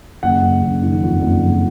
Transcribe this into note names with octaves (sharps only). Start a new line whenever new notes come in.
F#1 F#5
F#1
F#1
D#3
F2
F#1
F2